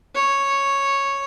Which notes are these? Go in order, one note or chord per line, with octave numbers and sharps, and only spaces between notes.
C#5